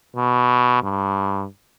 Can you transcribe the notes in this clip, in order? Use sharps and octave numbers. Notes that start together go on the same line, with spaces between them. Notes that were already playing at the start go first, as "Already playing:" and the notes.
B2
G2